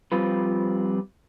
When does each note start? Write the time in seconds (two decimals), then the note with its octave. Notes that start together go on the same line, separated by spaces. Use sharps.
0.12 F3 G3 C4 F4 B4